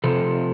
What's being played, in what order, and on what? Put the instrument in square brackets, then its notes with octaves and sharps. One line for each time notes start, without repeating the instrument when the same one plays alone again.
[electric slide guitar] C3 F3 A4